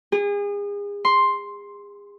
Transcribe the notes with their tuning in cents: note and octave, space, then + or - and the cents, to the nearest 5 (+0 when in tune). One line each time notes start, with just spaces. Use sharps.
G#4 -35
C6 +5